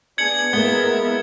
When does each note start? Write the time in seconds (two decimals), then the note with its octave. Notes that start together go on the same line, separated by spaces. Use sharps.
0.18 B3 D4 G#4 G#6 C#7 F#7
0.53 G#3 A#3 B3 E4 A#4 E5 G7